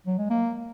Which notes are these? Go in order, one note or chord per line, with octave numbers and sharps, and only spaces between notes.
F#3
G#3
A#3